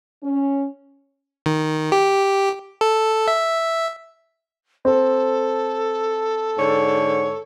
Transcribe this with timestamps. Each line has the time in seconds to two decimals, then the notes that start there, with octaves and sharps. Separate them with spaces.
0.24 C#4
1.46 D#3
1.92 G4
2.81 A4
3.27 E5
4.85 C4 A4
6.57 G#2 D3 C#5